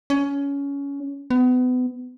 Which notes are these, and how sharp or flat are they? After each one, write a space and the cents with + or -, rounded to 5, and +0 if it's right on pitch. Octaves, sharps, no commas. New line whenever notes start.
C#4 +20
B3 +30